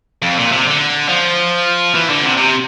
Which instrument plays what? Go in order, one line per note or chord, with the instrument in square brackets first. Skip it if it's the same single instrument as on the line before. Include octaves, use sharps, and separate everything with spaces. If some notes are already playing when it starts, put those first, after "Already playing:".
[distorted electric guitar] F2
A#2
C3
D3
F3
E3
D3
C3
C3